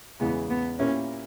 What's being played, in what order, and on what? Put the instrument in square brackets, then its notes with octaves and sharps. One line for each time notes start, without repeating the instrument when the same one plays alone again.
[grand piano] E2 C#3 E3 G#3 [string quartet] B3
[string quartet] B3
[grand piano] A#2 A#3 E4 G4 A#4 [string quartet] C#4